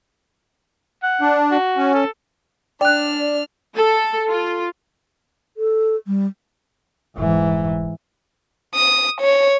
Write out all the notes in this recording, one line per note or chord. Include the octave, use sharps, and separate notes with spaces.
F#5
D4
F#4
C#4
A4
D4 D5 G5 F6 F#6
A4
F4
A4
G3
F1 G#2 E3
D#6
C#5